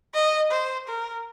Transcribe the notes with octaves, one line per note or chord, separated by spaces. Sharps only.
D#5
C5
A#4